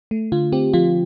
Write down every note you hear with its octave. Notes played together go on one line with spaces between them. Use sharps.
A3
D3 F4
C4 G4
F3 F4